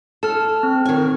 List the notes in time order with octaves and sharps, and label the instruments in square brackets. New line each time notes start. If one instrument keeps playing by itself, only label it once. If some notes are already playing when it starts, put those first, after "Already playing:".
[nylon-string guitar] A4 [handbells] A5 F6
[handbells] C4
[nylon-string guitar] D#3 G#5